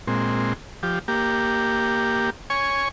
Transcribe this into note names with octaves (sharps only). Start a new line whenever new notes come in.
A#2 G#3 C4
F3 G4
A#3 G4
C#5 G#5 C#6